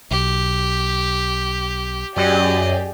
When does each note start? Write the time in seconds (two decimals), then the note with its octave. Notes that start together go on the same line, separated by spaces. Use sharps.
0.11 B1 G4
2.17 F#2 G4 G#4 D5 D#5